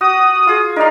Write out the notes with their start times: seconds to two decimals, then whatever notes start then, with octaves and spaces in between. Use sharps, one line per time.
0.01 F#4 D#6
0.47 F4 G#4
0.76 D#4 A#4 D5 F5